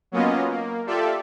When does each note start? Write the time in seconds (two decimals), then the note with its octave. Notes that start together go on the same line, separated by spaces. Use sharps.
0.12 F#3 A#3 B3 C#4 F4 D#5
0.51 A#3
0.87 F4 G4 A4 D5 E5